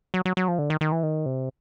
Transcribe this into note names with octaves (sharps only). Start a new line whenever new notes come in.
F#3
F#3
F#3
F3
D3
D#3
D#3
E3
D#3
C3